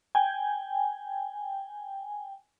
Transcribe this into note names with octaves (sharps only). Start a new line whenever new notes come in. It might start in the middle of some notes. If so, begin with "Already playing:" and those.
G5 G#5